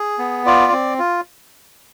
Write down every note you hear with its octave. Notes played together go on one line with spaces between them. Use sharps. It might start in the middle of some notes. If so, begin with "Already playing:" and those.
Already playing: G#4
B3
F4 D5
C4
F4